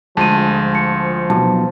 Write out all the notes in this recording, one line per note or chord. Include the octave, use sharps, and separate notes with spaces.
D2 F3 G#3 C5 A5 D#7
C#7
B1 A5